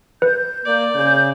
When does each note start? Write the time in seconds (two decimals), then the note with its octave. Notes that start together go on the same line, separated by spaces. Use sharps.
0.22 B4 G6
0.66 A#3 D5
0.95 C#3 G6